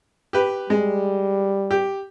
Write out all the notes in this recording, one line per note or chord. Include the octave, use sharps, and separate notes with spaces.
G4 B4
G3 G#3
G4